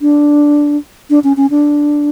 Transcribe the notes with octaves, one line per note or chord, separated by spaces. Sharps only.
D4
D4
C#4
C#4
D4